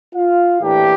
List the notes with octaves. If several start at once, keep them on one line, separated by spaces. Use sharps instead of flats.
F4 F5
A2 E3 A#3 D4 G4